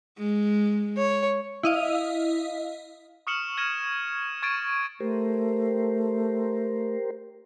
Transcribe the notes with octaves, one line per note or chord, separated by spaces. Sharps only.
G#3
C#5
E4 D#5 F5
C#6 D#6 F6 C#7 E7 F#7
F6 G#6 A#6 D#7 E7
C#6 G#6 A6 D7 D#7
A3 G4 A#4 C5